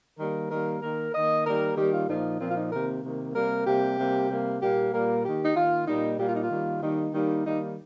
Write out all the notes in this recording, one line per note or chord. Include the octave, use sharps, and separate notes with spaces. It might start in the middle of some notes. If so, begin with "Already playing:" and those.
D#3 G3 A#3 A#4
D#3 G3 A#3 A#4
D#3 A#3 A#4
D#3 A#3 D#5
D#3 G3 A#3 A#4
D#3 G3 A#3 G4
F4
A#2 F3 A#3 D#4
A#2 F3 A#3 C4
F4
D#4
C3 D#3 A#3 A#4
C3 D#3 A#3
C3 G3 A#3 A#4
C3 G3 A#3 G4
C3 G3 A#3
C3 G3 A#3
A#2 G3 A#3 G4
A#2 G3 A#3 A#4
D#3 A#3 G4
D#4
D#3 A#3 F4
A#2 G3 A#3 D#4
A#2 G3 A#3 G4
F4
D#4
F4
D#3 G3 A#3
D#3 G3 A#3 D#4
D#3 G3 A#3 D#4
D#3 G3 A#3 D#4